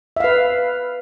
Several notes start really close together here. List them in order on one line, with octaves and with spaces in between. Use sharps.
E5 F5 B4